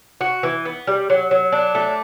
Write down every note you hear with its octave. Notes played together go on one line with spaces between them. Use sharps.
F#4
E3
B3
G3
F#3
F#3
D4
A3